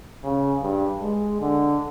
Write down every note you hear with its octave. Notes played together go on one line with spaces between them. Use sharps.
C#3
G2
G#3
D3